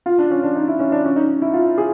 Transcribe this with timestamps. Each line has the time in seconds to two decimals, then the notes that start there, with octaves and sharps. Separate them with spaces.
0.06 F4
0.18 D4
0.31 C#4
0.43 D4
0.55 D#4
0.68 E4
0.79 C#4
0.92 D4
1.05 C#4
1.16 D#4
1.42 E4
1.54 F4
1.78 G#4